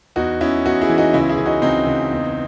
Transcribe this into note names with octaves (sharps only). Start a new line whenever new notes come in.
E2 D#4 F#4
E2 C#4 E4
E2 D#4 F#4
E4 G#4
E3
D#4 F#4
C#2 C#4 E4
E4 G#4
C#2
D#4 F#4
C#2 C4 D#4
C#2
E2